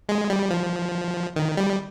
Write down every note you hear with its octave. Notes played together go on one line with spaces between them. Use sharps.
G#3
G3
F3
D#3
G3